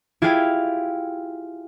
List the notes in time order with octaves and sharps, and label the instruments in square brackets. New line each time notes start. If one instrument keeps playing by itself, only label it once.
[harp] E4 F4 G4 G#4 F5 G5